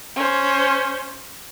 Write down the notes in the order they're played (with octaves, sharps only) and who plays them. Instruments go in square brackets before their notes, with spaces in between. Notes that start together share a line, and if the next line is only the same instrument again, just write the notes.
[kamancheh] C#4 C5